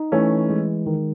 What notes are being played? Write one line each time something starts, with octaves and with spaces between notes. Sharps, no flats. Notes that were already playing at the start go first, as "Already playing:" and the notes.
Already playing: D#4
E3 A3 C#4
G#3
D#3